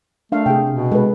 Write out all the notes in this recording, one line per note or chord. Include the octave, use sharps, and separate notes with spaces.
A3 D4 F5
C3 G#4 G5
B2
G#3 A4 B4